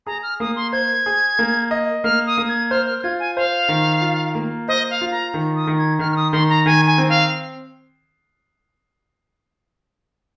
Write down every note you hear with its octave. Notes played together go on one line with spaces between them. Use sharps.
G#4 A#5
F6
A#3 D#6
C6
C5 G#6
G#4
A#3
D#5
A#3 F6
D#6
A#3
G#6
C5 F6
F6
F6
F4 G#6
G#5
C5 F5
D#3
F4
A#3
C5 D#5
F5
F4
A#5
D#3
D#6
D#3
G#6
D#3 F6
F6
D#6
D#3 C6
A#5
D#3 G#5
G#5
C4
F5